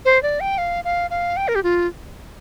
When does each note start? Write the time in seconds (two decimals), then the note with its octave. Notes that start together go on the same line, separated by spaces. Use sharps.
0.05 C5
0.23 D5
0.40 G5
0.58 F5
0.84 F5
1.10 F5
1.37 G5
1.48 A#4
1.55 G4
1.63 F4